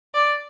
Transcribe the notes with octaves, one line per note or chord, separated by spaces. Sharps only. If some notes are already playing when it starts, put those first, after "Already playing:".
D5